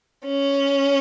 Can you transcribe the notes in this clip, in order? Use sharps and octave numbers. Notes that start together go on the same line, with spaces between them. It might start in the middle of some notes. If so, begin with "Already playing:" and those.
C#4